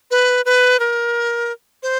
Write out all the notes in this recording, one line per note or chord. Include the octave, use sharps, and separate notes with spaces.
B4
B4
A#4
C5